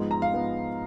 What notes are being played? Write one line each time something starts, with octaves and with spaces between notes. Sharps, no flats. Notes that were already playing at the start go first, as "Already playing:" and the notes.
Already playing: G#2 F3 G#3 B3
A#5
F5
G#2 F3 G#3 B3